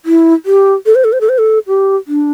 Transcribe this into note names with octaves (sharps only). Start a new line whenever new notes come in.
E4
G4
A4
C5
A4
C5
A4
C5
A4
G4
D4